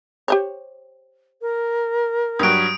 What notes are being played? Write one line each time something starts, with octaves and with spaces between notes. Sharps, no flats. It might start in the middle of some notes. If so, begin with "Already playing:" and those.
G4 C5 C#5
A#4
G2 F#3 D#6 D7